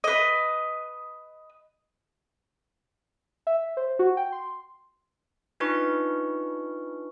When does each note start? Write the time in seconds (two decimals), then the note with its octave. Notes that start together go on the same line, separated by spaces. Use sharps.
0.04 B4 D#5
3.47 E5
3.77 C5
3.99 F#4
4.17 G5
4.32 C6
5.60 D4 D#4 F4 B4 C#6